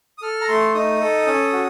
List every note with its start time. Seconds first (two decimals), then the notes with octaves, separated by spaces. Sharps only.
0.18 D#6
0.22 A4 F6
0.41 A#5
0.48 A3 C6
0.74 D#4 D#6
1.01 A4
1.27 C#4
1.53 F#4